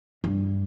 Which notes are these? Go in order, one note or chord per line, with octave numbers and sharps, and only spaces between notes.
G2